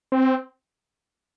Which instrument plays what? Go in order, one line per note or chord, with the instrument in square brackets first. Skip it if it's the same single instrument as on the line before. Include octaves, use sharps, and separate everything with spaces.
[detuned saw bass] C4